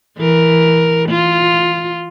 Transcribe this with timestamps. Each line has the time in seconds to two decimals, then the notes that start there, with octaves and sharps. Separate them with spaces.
0.18 E3 A#4
1.09 F4